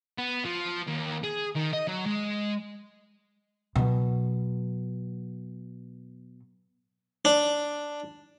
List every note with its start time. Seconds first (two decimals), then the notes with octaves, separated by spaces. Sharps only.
0.18 B3
0.45 F3
0.88 D#2
1.23 G#4
1.55 D#3
1.73 D#5
1.88 F#3
2.06 G#3
3.76 B2 F#3
7.25 D4